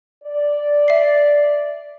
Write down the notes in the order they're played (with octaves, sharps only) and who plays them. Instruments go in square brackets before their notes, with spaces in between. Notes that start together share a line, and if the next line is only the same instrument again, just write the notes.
[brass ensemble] D5
[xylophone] E5 C7